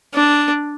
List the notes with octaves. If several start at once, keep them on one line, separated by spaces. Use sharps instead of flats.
D4